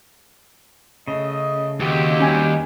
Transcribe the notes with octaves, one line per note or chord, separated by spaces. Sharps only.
C#3 A3 D#5
D#2 C4 F#4 G4
G3 C#4 G#5 G#6